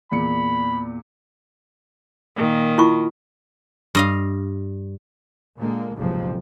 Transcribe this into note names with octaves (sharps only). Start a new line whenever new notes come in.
E2 A#2 B5 C#7
A#2 D#3
E4 F4 C#6
G2 D#5 F5
A#2 D3 G#3 A#3
F#1 B1 F2 G#2 C3 F3